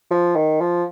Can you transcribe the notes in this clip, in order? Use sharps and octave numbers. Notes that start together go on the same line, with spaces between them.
F3
D#3
F3